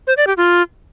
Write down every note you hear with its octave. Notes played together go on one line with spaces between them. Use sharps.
C5
D5
G4
F4